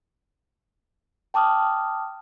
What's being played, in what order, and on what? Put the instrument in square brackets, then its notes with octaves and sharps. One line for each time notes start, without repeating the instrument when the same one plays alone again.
[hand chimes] G5 A5 D6 D#6 F6